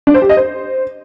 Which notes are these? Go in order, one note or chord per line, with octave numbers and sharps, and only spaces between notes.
D4
C5
G4
D#5
C5